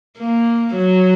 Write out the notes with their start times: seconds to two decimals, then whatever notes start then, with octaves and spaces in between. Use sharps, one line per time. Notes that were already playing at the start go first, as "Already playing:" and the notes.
0.18 A#3
0.76 F#3